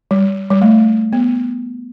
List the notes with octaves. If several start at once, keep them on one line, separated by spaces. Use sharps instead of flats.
G3
G3
A3
B3